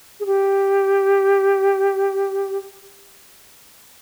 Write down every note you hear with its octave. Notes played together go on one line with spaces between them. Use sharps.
G#4
G4